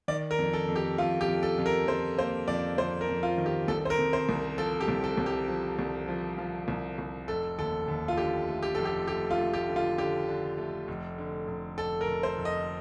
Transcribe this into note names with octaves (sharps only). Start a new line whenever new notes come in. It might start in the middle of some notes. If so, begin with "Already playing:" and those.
D#3 D5
A#4
F2
A4
F2
G4
F2 F4
G4
F2
A4
F2
A#4
F2 C5
A#3 C5
F2 D5
F2 C5
A#4
F2
F4
D#3
G4
C2 A4
C5
A#4
C3
C5
C2
F3 A4
G4
C2
A4
C2
G4
F3
C2
F3
F3
C2
C2
F1 A4
D#2 A4
D#2
F4
D3 G4
A3
G4
F1 A4
G4
A3 G4
F4
A3
G4
D3
F4
D3 G4
D3
A3
F1
D3
F1
F1 A4
A#4
F1
C5
F1
D#5